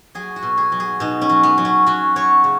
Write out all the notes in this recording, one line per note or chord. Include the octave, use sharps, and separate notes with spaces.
F#3 G#4
F#4
B2
G#4
F#3
G#4
B2 D#4
C#4
F#3
B3
F#3
C#4
F#3 F#4
F#3 C#5
C#3